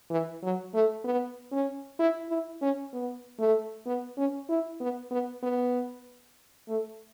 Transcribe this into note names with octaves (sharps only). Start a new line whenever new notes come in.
E3
F#3
A3
B3
C#4
E4
E4
C#4
B3
A3
B3
C#4
E4
B3
B3
B3
A3